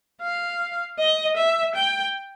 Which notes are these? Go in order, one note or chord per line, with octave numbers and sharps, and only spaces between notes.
F5
D#5
E5
G5